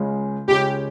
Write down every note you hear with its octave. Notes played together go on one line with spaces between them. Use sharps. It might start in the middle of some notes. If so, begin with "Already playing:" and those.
Already playing: C#2 C#3 G#3 C#4
C#2 C#3 G#3 C#4 G4